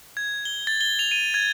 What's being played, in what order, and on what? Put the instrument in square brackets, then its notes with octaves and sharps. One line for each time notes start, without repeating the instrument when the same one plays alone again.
[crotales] G#6
G7
A6
G7
F7
D#7
G#6